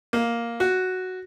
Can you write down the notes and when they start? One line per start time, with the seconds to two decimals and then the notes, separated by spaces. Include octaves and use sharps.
0.13 A#3
0.60 F#4